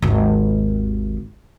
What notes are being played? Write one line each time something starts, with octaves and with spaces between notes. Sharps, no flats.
G#1 D#2